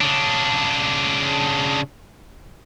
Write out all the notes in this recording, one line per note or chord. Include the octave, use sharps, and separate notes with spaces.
C#3 D4